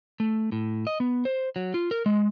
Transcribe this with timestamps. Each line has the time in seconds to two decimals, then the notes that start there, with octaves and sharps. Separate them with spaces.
0.20 A3
0.52 A2
0.87 D#5
1.00 B3
1.25 C5
1.56 F#3
1.74 F4
1.91 A#4
2.06 G#3